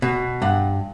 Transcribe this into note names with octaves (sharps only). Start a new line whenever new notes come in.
B2
G2 F#5